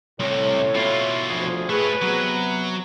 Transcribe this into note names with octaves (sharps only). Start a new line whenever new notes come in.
C2 A2 C3 C#5
B2 F4 E5
D2 F3 G#4
A3 G#4 B4 C#5
C3 F#3 B3